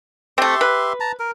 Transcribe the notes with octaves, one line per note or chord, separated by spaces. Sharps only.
A3 C4 G4 E5 C6
B4
A5 A#5
A#4